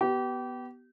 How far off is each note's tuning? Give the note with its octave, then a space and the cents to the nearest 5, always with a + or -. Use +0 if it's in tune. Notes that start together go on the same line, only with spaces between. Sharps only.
B3 +0 G4 -30